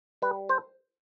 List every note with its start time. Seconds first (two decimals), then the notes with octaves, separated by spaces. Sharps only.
0.22 G3 B4
0.49 C5